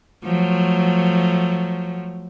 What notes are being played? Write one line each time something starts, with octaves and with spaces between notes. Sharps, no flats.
F3 F#3 A3